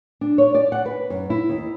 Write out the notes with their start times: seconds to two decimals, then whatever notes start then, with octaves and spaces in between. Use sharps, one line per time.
0.21 D4
0.38 C#5
0.55 D5
0.72 F#5
0.86 B4
1.10 F#2
1.30 E4
1.49 D#2